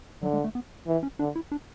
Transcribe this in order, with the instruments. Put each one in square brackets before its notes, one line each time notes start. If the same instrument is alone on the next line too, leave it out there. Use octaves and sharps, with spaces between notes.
[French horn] D3 [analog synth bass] F#3
[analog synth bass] G#3
A3
B3
[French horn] E3
[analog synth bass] C#4
[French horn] D3 [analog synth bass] D4
[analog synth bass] E4
D4